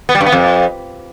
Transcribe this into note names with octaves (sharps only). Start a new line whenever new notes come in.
B3
G3
G2
B3
F2